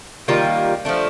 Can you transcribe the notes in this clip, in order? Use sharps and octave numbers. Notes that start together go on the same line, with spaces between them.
D#3 G3 A#3 F4
F3 A3 D4